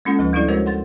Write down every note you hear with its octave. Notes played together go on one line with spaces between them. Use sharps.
G#3 A#3 C#4 F4 A4 F#5
D2 F3 D#4 B4
G3 D4 E4 A4 D5
G#3 F#4 A#4 C5 C#5 D#5
A4 F#5 C6 A6